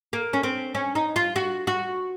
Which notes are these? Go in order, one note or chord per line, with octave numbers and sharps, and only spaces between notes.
A#3
C#4
C4
C#4
D#4
F4
F#4
F#4